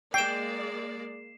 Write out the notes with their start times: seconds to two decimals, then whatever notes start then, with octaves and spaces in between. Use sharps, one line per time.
0.14 G#3 A#3 D5 G5 C7 E7